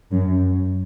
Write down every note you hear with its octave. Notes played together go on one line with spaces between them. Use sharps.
F#2